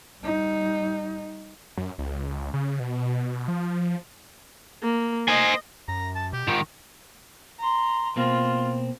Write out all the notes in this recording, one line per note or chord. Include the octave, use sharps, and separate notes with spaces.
G3 D#4
F#2
C#2
C#3
B2
F3
A#3
C5 D#5 G#5
F#2 A#5
A5
B2 G4
G#2 D#3 F4
A#5 C6
B2 A#3 C4 F4